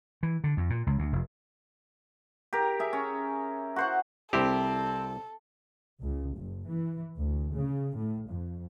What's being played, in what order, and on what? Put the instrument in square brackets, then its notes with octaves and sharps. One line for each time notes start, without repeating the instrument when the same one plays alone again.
[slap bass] E3
D3
F2
A#2
C#2
D2
F1
[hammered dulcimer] G4 A#4
G#4 E5
C#4
F#4 C5 F#5
[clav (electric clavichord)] C2 E4 G4 [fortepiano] C4 [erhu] A4
[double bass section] C#2
F#1
E3
D2
C#3
A2
F2